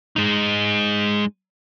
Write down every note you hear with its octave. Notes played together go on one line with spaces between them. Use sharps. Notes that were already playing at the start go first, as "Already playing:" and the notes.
G#3 D#4